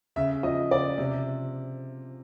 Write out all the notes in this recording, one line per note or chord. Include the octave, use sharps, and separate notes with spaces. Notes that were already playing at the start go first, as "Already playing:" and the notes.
C#3 E5
F3 D#5
C#3 D5
C3